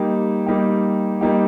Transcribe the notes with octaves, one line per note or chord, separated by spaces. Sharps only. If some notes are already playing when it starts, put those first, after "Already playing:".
Already playing: G3 A#3 D#4 G4
G3 A#3 D#4 G4
G3 A#3 D#4 G4